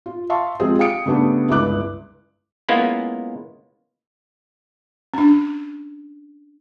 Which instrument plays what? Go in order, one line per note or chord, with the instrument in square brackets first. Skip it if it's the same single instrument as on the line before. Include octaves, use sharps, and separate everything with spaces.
[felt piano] F4
E5 F5 A5 C6 C#6
F3 G#3 C4 F4 G4 G#4
F5 G5 D#6 C#7 D7
C#3 G3 A3 B3 D4
G1 C#2 E4 E5 D6 F#6
[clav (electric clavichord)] G#3 A#3 B3 C#4 E4 F4
[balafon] C#4 D4